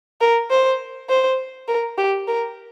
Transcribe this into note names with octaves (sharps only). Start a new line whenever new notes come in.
A#4
C5
C5
A#4
G4
A#4